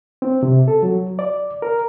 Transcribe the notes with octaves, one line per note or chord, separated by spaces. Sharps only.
C4
C3
A4
F#3
D5
A#4